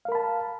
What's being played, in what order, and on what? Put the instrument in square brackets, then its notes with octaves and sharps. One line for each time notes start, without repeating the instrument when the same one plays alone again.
[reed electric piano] F5
A#4
B5
A5